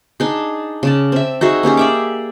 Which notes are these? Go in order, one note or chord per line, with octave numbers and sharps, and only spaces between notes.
D4 D#4 G#4
C#3 D5 A5
C4 E5
D#4 F#4 G#4 E5
A#3 C#4 G4 G#4
D5 E5 D6